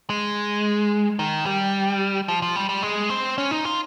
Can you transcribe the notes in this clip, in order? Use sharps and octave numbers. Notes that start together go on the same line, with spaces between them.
G#3
D#3
G3
F3
F3
G3
G3
G#3
C4
C#4
D#4
F4